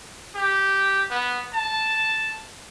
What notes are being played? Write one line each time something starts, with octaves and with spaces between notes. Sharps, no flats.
G4
B3
A5